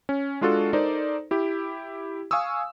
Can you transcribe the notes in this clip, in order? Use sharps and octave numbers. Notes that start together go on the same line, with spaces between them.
C#4
G#3 D4 F4 F#4 A4
D#4 A4 A#4 C5 D5
E4 G4
F5 G#5 C#6 D#6 E6